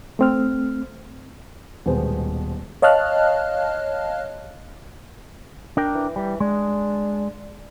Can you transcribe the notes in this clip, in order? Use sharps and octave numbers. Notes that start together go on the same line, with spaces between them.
A3 C4 F6
D#1 B2 G#3 B3 C5
C#5 D#5 F5 A5 F6 F#6
D4 A#4 G5
E3
E3 G3
G#3 D4